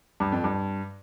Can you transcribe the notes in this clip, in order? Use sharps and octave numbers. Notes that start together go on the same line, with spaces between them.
G2
F2
G2